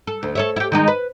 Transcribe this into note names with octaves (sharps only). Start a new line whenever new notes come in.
A4
D2
A4 C#5 E5
E4 G4
D#3 G#3 D#4
B4